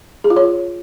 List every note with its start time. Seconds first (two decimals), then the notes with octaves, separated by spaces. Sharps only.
0.24 G#4
0.30 F4
0.36 C#5